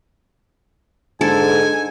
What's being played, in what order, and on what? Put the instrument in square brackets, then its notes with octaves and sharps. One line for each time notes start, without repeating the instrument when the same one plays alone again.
[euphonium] G#2 [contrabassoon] D3 [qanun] A4 [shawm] G#5